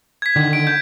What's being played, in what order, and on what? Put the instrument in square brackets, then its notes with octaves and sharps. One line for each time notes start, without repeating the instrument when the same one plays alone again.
[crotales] G#6 B6
[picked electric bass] D3 D#3
[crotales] D7
G6